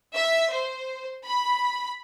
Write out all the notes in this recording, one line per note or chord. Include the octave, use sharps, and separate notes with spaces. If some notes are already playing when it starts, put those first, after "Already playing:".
E5
C5
B5